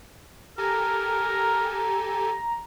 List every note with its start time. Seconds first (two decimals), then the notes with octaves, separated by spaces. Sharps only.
0.58 G4 A4 A#4 G#5 A#5